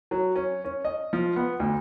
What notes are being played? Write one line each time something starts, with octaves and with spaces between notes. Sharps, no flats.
F#3
C#4
C#4
D#5
F3
B3
D2